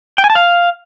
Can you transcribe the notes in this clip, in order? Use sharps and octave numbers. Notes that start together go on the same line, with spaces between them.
G5
G#5
A5
F5